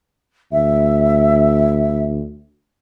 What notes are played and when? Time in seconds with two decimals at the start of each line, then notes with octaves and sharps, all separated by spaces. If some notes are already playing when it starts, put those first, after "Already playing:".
0.52 D2 E5